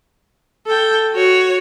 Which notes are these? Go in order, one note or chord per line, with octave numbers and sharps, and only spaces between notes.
A4 G5
F#4 C#5